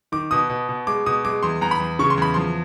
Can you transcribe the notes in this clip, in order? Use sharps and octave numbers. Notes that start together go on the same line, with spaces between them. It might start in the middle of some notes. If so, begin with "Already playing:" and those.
D#3 D6
B2 D#6
B2
B2
G#3 D6
B2 D#6
G#3 D6
E2 C6
E2 A#5
B5
E2
C#3 C#6
C6
E2 B5
F3 C6